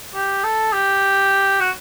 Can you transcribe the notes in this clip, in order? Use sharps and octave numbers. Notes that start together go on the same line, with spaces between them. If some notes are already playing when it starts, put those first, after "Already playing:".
G4
A4
G4
F#4